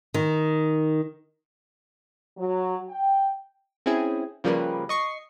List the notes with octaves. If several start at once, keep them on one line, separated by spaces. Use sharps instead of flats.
D#3
F#3
G5
C4 C#4 E4 G#4
C#3 F3 G3 A#3 A#4 B4
D#5 C#6 C7